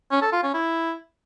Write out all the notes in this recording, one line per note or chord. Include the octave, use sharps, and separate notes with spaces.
C#4
A4
F4
C#4
E4